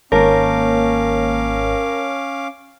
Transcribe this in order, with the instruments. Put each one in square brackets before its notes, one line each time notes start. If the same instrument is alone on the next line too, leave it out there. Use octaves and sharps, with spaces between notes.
[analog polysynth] G#1 A#3 [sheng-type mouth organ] C#4 F5 D6 [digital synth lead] A#4 [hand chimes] C#5 A5